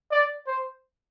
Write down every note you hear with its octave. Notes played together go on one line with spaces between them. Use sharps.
D5
C5